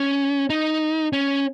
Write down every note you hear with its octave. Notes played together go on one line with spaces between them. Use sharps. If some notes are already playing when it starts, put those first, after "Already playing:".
Already playing: C#4
D#4
C#4